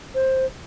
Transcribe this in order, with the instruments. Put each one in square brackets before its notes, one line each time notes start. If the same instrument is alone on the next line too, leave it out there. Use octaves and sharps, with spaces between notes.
[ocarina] C5